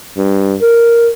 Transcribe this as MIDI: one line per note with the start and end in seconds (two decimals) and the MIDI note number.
0.18 0.56 43
0.62 1.10 70